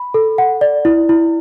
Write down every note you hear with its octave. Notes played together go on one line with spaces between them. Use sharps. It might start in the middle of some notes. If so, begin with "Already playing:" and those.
Already playing: B5
A4
F#5
D5
E4
E4